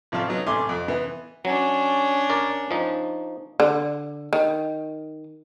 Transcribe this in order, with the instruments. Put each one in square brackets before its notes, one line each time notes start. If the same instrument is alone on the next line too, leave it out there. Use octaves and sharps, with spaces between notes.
[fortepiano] A1 F3 C4 F5 A5
F#3 B3 D#4
A1 C3 A3 G#5 C6 D6
F2
E3 B3 E4
[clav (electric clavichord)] F#3 [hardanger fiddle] C#4 D4
[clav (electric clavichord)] A#4 D5
F3 D#4
[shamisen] D3
D#3